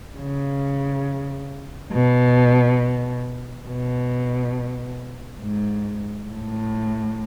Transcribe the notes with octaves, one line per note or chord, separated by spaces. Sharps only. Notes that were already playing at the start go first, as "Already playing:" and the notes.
C#3
B2
B2
G#2
A2